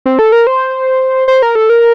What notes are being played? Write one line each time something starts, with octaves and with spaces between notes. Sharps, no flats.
C4
A4
A#4
C5
C5
A#4
A4
A#4